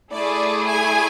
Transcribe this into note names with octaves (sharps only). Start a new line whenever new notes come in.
A3 E4 G#4 D5
G#5